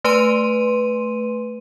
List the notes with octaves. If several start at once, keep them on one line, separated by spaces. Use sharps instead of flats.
A3 B4 G#5 C6 D#7